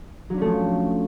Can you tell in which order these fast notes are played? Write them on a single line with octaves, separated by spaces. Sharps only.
F#3 D4 C#4 A3 F3